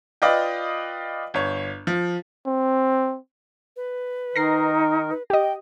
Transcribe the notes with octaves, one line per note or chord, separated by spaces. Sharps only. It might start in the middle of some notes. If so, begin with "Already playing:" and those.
F4 B4 D5 D#5 F5 G5
G1 C#5
F3
C4
B4
D#3 D#4 A#4 A#6 C7
B4
G4 D#5 G5